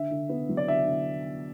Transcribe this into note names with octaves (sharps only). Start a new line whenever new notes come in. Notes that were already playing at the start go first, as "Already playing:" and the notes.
Already playing: D3 E5
D3
B3
F#3
D5
D3 E5
D3